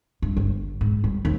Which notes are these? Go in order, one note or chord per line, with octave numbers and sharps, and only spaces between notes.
G2
G1
G#2
G3
D#2